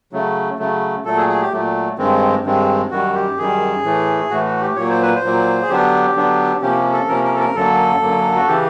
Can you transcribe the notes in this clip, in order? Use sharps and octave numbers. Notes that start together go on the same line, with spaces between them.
C#3 F#3 A3
C#3 F#3 A3
A#2 F#3 A3 A4
G#4
G#4
G4
A#2 F#3 A3
G2 D#3 G#3 C4
G2 D#3 G#3 C4
F#2 D#3 G3 F#4
G4
F#2 D#3 G3 G#4
A2 E3 A3
A2 E3 A3 F#4
F#4
G4
A#2 F#3 A#3 C#5
C5
B4
C5
A#2 F#3 A#3
G#4
D3 F#3 B3 D4 G4
D3 F#3 B3 D4
C3 F3 A#3 C#4 G4
A4
C3 F3 A#3 C#4 A#4
A#4
A4
A#4
F#2 D3 F#3 A#3 A4
F#2 D3 F#3 A#3
F#4
C#3 E3 G4